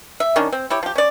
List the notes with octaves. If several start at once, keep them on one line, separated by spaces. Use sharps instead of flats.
E5
D#3 C#4 D4
C4
E4 G4 C#5
F3 G4
C#4 D5